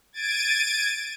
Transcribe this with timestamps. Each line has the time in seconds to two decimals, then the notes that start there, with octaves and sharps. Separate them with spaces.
0.13 G#6 A6 D7 D#7